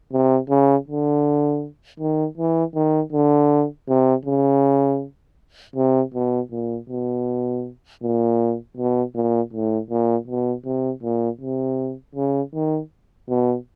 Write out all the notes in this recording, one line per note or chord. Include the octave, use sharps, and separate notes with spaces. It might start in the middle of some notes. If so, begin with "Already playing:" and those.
C3
C#3
D3
D#3
E3
D#3
D3
C3
C#3
C3
B2
A#2
B2
A#2
B2
A#2
A2
A#2
B2
C3
A#2
C3
C#3
D#3
B2